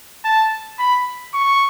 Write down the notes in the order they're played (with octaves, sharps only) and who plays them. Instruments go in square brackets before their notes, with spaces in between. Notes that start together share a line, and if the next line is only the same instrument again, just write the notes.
[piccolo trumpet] A5
B5
C#6